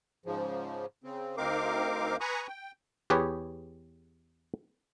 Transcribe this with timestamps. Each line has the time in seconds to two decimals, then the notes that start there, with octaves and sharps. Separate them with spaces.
0.26 G#2 C#3 F3
1.04 C#3 C4
1.37 D2 C4 D#4 A#4 F5 D6
2.20 B4 G#5 A#5 B5 C#6 D#6
2.48 G5
3.10 E2 G4 G#4 B4 C#5